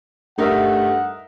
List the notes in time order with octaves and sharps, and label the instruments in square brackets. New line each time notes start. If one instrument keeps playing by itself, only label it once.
[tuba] G2 [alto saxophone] A3 [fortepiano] D#4 A#4 E5 [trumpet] F#5